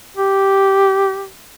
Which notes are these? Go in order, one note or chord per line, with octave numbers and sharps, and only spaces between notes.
G4